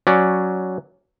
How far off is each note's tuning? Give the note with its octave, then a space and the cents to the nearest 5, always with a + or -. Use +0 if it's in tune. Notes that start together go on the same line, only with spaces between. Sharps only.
F#3 +0 C#4 +0 D5 +0